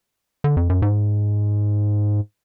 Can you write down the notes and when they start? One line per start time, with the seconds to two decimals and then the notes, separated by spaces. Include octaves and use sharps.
0.44 D3
0.57 F2
0.70 F#2
0.82 G#2